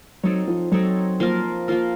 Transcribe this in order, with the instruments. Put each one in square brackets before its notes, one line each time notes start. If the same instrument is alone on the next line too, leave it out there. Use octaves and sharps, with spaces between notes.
[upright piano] F#3 [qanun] C4 D#4 A4 C#5
[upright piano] F3
[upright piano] F#3 [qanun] C4 D#4 A4 C#5
[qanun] F3 A#3 F4 A#4
F3 A#3 F4 A#4